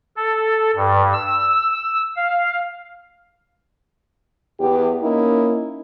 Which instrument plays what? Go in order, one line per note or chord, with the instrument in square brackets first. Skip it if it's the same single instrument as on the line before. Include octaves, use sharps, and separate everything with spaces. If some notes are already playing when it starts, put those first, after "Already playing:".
[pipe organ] A4
G2
E6
F5
[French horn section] E2 G4
A#3 C#4 D#4 E4